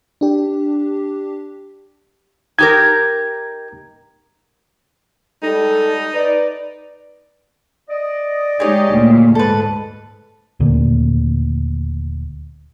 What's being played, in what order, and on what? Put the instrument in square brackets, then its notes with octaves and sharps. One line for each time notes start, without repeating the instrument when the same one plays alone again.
[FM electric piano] D4 G4
[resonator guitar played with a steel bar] D#4 G4 A#4 [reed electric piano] G#6
[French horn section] G3 G#3 A4 [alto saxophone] D#4
[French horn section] B4 D5
[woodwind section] D5 D#5
[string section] G#3 D#4 G4 [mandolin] G#4 C#5
[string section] D2 A#2
[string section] G#2 [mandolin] A4 B4
[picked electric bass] D#1 D2 A#2